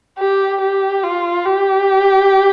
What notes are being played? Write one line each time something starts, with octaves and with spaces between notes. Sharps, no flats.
G4
G4
F4
G4